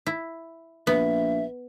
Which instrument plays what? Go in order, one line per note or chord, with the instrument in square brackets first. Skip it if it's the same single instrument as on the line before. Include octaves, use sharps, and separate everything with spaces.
[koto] E4
[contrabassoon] A#1 [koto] B3 [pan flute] E5